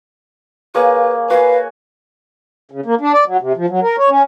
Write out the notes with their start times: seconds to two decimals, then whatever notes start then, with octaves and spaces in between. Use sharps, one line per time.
0.75 A#3 G#4 B4 C#5
1.30 F#4 B4 F5 G#5
2.71 C#3
2.86 A#3
3.01 D4
3.13 D5
3.27 F#3
3.41 C3
3.57 F3
3.70 F#3
3.82 A#4
3.98 C#5
4.09 C#4